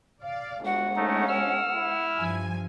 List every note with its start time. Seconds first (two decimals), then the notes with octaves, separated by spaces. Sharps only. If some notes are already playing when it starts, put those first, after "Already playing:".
0.22 D5 F5
0.65 G1 G#3 F#4 F#5
0.96 A3 C#4 D#4
1.28 E6 F6
1.74 E4
2.18 G2 F3 G#5